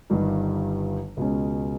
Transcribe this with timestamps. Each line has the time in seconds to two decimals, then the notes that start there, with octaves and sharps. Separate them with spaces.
0.10 G1 G2 D#3 G3
1.17 C#2 B2 G#3 C#4